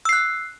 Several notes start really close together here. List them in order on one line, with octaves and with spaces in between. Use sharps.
E6 C7 F#6